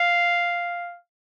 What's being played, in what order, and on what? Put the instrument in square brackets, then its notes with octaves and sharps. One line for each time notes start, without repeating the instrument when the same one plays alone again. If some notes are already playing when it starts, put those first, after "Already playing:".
Already playing: [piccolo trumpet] F5